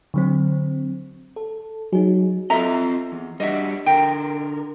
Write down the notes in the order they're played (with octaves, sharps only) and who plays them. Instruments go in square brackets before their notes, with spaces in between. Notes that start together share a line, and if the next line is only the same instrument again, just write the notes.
[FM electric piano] D3 F#3 C4
A4
[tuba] F#3 [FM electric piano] D#4 G#4
[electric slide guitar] C4 F4 D#5 [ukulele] A4 E5 A#5
[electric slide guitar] E2
[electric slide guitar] G3 D4 F#4 [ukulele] D#5 E5
[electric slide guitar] D3 A#4 [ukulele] G5